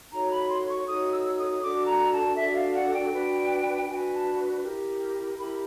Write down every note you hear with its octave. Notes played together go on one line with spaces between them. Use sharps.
D#4 F#4 A4 C#5 A#5
B5
C6
C#6
D#4 F#4 A4 C#5 D#6
E6
D#6
D4 F#4 A4 D6
A#5
A5
D4 F#4 A4 E5
F5
F#5
G5
D4 F#4 B4
D4 F#4 B4 G#5
A5
E4 G4 A#4
E4 G4 A#4 B5